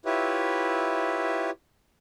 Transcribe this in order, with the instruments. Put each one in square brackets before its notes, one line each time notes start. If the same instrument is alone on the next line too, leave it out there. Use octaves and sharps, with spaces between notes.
[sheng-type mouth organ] E4 F4 G4 B4 C#5 E5